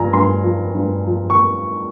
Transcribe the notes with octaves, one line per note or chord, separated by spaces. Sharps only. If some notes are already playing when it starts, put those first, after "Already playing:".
Already playing: G2 F3 G#5 A#5
G2 C6
F3
G2
F3
C#6